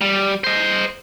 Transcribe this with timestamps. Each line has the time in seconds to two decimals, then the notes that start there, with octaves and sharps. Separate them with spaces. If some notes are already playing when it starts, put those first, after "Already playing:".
0.01 G3
0.44 C5 D#5